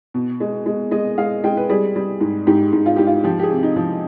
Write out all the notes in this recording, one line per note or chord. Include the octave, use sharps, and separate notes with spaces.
B2
G#3
G#3
G#3 D#5
G#3 F5
G#3 G5
B4
G3 G#4
G3
G#2
G#2 G4
G#2
F4
G#2 G4
F4
F3 G4
G4
G#4
C3
D#4
F3